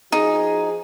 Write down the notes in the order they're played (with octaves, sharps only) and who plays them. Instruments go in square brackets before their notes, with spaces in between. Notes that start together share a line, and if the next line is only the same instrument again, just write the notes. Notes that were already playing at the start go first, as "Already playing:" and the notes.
[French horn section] F3 F#4 G#4 [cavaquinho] D#4